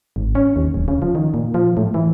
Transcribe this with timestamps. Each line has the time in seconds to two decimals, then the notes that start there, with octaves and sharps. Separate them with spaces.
0.16 G#1
0.35 C#4
0.56 D#2
0.74 D1
0.88 C#3
1.02 F3
1.15 D#3
1.34 A#2
1.54 F3
1.77 A2
1.94 E3